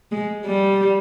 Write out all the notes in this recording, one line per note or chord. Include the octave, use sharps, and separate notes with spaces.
G#3
G3